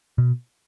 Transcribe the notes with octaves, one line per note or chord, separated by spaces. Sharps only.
B2